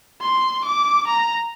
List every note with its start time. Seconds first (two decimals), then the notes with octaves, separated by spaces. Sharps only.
0.22 C6
0.65 D6
1.08 A#5